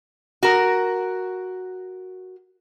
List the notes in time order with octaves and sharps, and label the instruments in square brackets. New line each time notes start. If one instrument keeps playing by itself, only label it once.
[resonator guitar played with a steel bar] F#4 A#4